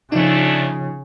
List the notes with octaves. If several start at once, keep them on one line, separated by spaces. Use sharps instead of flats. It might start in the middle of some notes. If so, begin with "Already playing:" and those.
E2 C#3 F3 A3 D4 D#4